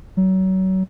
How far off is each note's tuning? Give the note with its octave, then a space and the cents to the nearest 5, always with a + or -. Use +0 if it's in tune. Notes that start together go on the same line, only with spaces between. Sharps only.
F#3 +30